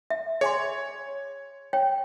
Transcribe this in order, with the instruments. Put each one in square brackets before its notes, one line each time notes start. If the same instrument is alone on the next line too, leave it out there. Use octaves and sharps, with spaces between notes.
[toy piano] E5
[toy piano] G#4 G#5 C6 [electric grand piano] C#5
[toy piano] C#5 G5